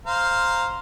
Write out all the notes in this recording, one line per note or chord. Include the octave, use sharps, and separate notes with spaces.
C5 F5 A#5